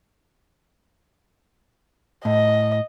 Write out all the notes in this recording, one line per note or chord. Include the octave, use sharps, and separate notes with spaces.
A2 D#5